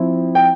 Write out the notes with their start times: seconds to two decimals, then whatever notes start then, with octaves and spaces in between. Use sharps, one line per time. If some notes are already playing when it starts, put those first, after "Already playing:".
Already playing: F3 C4 E4
0.35 G5